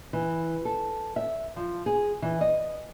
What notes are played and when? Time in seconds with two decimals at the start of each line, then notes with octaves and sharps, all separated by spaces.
0.13 E3
0.65 A4
1.16 E5
1.56 F3
1.86 G#4
2.22 E3
2.41 D#5